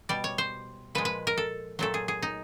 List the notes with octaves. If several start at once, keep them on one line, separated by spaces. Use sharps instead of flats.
B2 G3 D5
C#5
C5
A#2 F3 G#3 B4
B4
A#4
A4
A#2 F#3 A3 A4
G#4
G#4
D#4